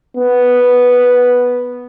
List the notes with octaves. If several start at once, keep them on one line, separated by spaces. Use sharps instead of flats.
B3